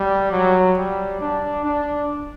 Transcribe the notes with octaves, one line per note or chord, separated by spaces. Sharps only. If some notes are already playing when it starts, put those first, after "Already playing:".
Already playing: G3
F#3
G3
D4
D4